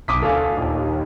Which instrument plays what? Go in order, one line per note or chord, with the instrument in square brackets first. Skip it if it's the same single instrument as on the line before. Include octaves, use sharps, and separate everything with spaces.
[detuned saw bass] B1 [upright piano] D6 D#6 B6
[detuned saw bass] D2 [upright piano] A4 F5 G#5
[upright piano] A#1 [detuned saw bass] D#2